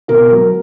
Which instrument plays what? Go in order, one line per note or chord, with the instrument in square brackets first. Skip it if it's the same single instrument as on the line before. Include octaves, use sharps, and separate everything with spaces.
[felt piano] B2 A#4
F#3